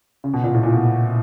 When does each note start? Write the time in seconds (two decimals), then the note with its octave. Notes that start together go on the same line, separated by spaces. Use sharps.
0.24 C#3
0.34 B2
0.43 A#2
0.54 A2
0.63 A#2
0.73 B2